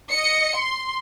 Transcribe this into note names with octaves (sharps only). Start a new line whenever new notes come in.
D#5 C#7
C6